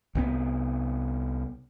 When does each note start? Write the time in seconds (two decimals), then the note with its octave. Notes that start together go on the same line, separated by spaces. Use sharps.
0.15 C2 C3 D#3 B3